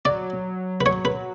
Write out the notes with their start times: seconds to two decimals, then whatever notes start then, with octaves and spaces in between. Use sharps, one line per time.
0.05 F#3 D5
0.81 B4
0.86 C#5
1.05 B4